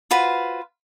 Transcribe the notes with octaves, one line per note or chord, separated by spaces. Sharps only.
F4 F#4 B4 C5